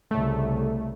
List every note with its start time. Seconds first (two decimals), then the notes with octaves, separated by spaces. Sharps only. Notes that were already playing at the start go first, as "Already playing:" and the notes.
0.11 C2 C#3 A3